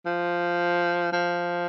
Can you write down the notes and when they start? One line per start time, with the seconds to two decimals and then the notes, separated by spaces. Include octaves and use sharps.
0.06 F3
1.12 F3